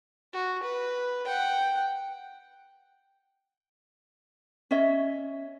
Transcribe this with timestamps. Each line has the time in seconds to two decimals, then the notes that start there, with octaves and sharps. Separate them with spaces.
0.33 F#4
0.63 B4
1.25 F#5 G5
4.71 C#4 C#5 D#5 E5